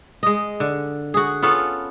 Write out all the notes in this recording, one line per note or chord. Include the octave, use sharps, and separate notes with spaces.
G#3 D#5
D3
F#4 G#4
B3 C#4 F4 A4